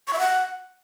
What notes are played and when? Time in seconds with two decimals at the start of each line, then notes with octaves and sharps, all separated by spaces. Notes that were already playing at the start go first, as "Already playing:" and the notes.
0.08 C#6
0.13 E5
0.19 F#5